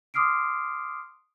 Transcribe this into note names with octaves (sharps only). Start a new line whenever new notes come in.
C6 D6 D#6 F6 C7 D7